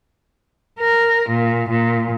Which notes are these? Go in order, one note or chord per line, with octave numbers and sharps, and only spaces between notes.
A#4
A#2
A#2